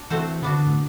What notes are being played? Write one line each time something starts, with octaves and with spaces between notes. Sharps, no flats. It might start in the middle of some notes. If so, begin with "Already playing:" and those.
Already playing: D4
E3 A3 C4 F#4 C5
D3 B3 D4 F#4
A2